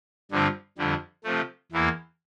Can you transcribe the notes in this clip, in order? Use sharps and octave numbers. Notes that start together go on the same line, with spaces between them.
G2 D3 F3 C4
F2 D3 G3
C3 F3 A3
E2 E3 A#3 E4